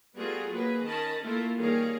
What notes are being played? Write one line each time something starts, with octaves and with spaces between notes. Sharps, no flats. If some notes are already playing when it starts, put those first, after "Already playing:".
G3 A3 B3 F4 F#4 G#4
F#3 A#3 G#4 B4
D#3 C#4 D#5 A5 B5
A3 A#3 E4 F4 A4
D#3 G3 A#3 G#4 C#5 F5